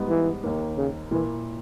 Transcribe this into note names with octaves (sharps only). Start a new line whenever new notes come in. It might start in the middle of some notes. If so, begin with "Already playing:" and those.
Already playing: G#2 G3 B3 D#4
E3
D#2 D#3 A#3
C#3
A#2 E3 A#3 E4